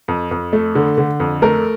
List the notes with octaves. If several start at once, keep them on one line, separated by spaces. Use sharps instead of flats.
F2
F2
A3
D3
D3
F2
A3 A#4